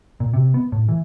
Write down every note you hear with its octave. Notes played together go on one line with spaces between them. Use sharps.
A#2
C3
B3
A2
E3